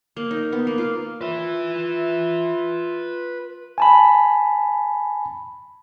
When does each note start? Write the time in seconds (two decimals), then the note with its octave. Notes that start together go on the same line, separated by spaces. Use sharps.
0.17 A#3
0.31 D#4
0.52 B3
0.67 A#3
0.78 F4
1.21 F4 B4 E5
3.78 G#5 A5 B5